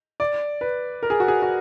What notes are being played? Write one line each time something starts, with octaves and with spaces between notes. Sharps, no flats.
D5
B4
A#4
G#4
F#4
G#4
F#4